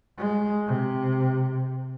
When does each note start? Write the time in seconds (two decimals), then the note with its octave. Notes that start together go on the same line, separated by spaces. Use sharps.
0.18 G#3
0.67 C3